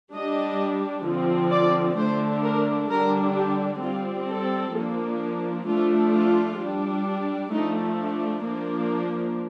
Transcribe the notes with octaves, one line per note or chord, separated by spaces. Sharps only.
G3 D4 D#5
D3 F3 C4
D5
D3 A3 D4 C5
A#4
D3 G3 D4 A#4
G4
G3 C4 F4
A4
F3 A#3 D4
F3 A3 D4 F4
F4
G3 D4
F3 A3 D4 D#4
D4
F3 A#3 D4